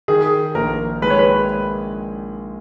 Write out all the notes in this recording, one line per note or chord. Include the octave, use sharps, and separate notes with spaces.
D#3 G#4
A#1 A#4
G#3 B4
C#5
B4